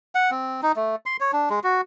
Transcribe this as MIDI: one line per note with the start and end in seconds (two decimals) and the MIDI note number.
0.15 0.31 78
0.31 0.61 60
0.63 0.72 63
0.76 0.96 57
1.06 1.17 84
1.20 1.31 73
1.33 1.49 62
1.50 1.60 56
1.64 1.81 66